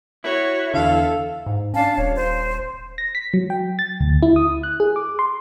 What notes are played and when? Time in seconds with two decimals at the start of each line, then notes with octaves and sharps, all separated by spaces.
0.24 E4 F#4 C#5
0.74 E2 D3 A4 F5
1.46 G#2
1.74 C#4 D4 F5 A5
1.98 D#1 C#5
2.16 C5
2.98 A#6
3.15 B6
3.34 F#3
3.50 G5
3.79 A6
4.00 D2
4.23 E4
4.36 D#6
4.63 F#6
4.80 G#4
4.96 D6
5.19 C6